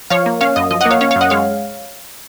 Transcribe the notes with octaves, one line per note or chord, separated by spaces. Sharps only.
F3 C#5 F5
A#3
C#4 C#5 F5
F#2 D#5
F3 D#5
A#3 D#5 F#5
C#5 F5
C#4 C#5 F5
F#2 C#5 F5
D#5 F#5
G#3 C#5 F5